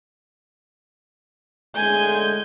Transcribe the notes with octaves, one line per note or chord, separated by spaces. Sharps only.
A2 D3 G#3 G#5 G6